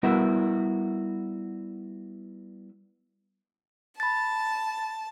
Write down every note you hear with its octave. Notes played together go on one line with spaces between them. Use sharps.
G3 B3 E4 F#4 A#4 E5
A5 B5 A6